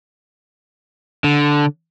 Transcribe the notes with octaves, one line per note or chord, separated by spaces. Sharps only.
D3